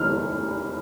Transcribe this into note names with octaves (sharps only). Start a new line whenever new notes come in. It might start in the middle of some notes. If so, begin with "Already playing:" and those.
Already playing: F6